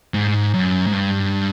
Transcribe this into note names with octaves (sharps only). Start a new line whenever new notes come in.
G#2
F#2
G#2
G2